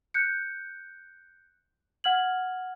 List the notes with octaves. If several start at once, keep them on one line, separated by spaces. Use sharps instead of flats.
F#6 G6 C#7
F#5 F6 G#6 F#7